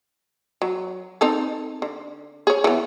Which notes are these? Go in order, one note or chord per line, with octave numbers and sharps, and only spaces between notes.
F#3
C4 D#4 A4
D3
G#4 C#5
E3 B3